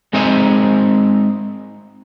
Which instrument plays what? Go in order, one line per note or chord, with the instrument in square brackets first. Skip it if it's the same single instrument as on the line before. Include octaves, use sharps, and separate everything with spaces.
[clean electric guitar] G#3 C4 D#4 C5 E5 G#5